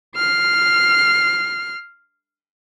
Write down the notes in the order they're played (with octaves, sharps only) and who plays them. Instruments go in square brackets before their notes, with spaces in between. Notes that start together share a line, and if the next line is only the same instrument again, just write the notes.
[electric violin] F6 C7